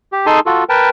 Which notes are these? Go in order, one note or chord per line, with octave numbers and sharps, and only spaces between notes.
G4
D#4 G#4 A4 G#5 A5 C6
F4 F#4 A4
A#4 B4 G5 A5